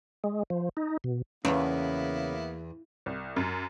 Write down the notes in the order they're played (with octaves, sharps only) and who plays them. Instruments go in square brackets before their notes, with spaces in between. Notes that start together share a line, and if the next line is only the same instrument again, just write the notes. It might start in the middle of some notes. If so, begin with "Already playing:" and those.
[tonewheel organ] G#3
F3
D#4
B2
[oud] E2 [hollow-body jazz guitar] C#3 [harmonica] A#3 B3 E4
[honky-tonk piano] C2
F#2